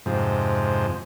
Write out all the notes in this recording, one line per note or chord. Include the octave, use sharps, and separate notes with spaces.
F2 G#2 C3